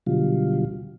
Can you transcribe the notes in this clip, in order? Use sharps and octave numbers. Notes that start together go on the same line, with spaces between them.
B2 D3 F#3 G3 F4